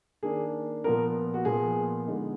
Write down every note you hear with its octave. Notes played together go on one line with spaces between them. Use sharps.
D#3 A#3 D4 G#4
A#2 F3 B3 A#4
F#4
A#2 F3 B3 G#4
D3 G#3 B3 D#4